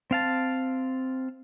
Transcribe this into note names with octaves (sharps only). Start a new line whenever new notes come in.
C4 F5 A5